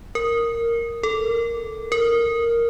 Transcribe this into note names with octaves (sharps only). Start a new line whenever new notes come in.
A#4
A4
A#4